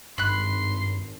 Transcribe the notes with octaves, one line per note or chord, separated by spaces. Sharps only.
G#1 G2 B5 C6 F#6